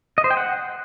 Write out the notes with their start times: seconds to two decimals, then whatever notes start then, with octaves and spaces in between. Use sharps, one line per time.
0.18 D#5
0.24 C5
0.31 G5
0.37 F#5